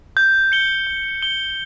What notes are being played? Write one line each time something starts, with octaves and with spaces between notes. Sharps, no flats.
G6
C#7 G7
G6
C#7 G7